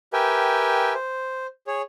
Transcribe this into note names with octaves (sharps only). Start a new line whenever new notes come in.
G4 A#4 B4 E5 G5 G#5
C5
G#4 C#5